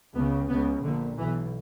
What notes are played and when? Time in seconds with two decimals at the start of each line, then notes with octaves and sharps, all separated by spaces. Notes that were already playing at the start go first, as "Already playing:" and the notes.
0.15 C#2 C#3 B3
0.49 C#2 C#3 B3
0.83 A#1 A#2 D3
1.18 B1 B2 E3